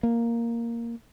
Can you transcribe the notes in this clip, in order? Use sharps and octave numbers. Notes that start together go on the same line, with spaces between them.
A#3